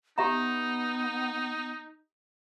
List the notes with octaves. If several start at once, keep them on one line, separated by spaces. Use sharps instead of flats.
B3 D#4 G4 E5 A#5